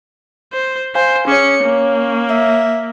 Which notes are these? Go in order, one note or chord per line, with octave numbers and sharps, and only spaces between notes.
C5
C5 F5 G#5
C#4 G#4 C#5 D6 C#7
A#3 C#4
E5